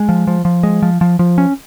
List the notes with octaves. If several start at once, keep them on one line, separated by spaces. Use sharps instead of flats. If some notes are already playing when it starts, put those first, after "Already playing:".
Already playing: G#3
F3
F3
F3
G#3
F3
F3
F3
C#4